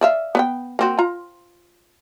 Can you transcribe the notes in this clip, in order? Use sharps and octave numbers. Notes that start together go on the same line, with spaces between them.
D5 E5 F5
B3 D5 G5
A#3 C4 F#4
F4 A#5